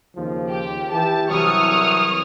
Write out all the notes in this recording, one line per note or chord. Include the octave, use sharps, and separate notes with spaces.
D#2 C#3 F3
G4
E3 G4 A5
C2 E3 F#3 C#6 D#6 F6